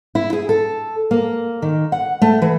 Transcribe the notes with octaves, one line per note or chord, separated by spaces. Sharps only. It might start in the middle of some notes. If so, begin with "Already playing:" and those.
E4
G#4
A4
A#3
D#3
F#5
A3
E3